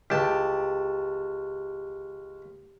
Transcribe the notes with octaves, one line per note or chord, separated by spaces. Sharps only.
C#2 G4 A5